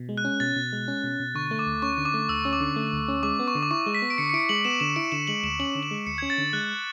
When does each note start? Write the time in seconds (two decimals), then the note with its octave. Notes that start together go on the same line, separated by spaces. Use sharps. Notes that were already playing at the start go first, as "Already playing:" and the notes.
Already playing: B2
0.09 G#3
0.17 F#6
0.25 C#4
0.40 B2 A6
0.56 B2
0.73 G#3
0.88 C#4
1.04 B2
1.20 B2
1.35 D3 C#6
1.51 A3
1.59 D6
1.66 D2
1.82 C#4 C#6
1.98 D3
2.05 D6
2.14 A3
2.29 D2 E6
2.44 C#4 E6
2.53 D6
2.60 D3
2.76 A3
2.93 D2
3.08 C#4
3.23 G#3 D6
3.39 B3
3.48 C#6
3.55 D3
3.63 D6
3.71 E4 C#6
3.86 G#3
3.94 B6
4.02 B3
4.10 D7
4.18 D3 C#7
4.30 C#7
4.33 E4 D7
4.49 G#3 F#7
4.65 B3 E7
4.80 D3 E7
4.96 E4 D7
5.12 D3 E7
5.27 G#3 F#7
5.43 D2 E7
5.59 C#4 F#7
5.75 D3
5.83 E7
5.91 G#3
6.07 D2 C#7
6.18 C#4 G#6
6.30 A6
6.38 D3
6.53 G#3 F#6